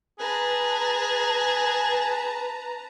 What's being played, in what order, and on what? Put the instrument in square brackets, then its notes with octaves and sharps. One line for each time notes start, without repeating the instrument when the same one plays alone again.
[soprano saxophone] G#4 [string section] B4 A5 A#5